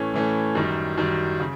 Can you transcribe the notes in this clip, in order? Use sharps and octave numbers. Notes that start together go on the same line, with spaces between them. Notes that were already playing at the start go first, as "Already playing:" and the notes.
Already playing: A2 E3 A3 C#4
A2 E3 A3 C#4
F#2 D#3 G3
F#2 D#3 G3
C#3